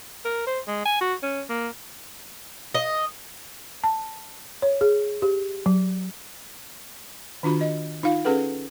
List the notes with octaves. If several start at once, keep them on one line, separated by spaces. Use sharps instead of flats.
A#4
C5
G#3
G#5
F#4
C#4
A#3
D#5
A5
C#5
G#4
G4
F#3
D#3 D4 F4 F#4 B5
D#5
D#4 F4 F5
C#4 G#4 A4 B4 F#5